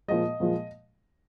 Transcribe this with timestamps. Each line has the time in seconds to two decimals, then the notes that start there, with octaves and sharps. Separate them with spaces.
0.08 A#2 F3 G#3 D#5
0.40 A#2 F3 G#3